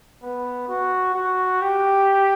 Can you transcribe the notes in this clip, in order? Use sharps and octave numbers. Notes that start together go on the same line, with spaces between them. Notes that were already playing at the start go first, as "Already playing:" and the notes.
B3
F#4
F#4
G4